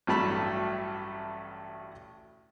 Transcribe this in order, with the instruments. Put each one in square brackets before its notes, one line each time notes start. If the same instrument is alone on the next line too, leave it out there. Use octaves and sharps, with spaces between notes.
[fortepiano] A1 G2 F#3 A3 A5 B5